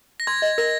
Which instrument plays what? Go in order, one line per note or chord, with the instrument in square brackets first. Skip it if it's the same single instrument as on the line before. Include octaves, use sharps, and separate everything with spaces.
[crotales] A#6
[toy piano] C6 [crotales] G#6
[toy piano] D#5
[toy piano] A#4 [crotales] A#6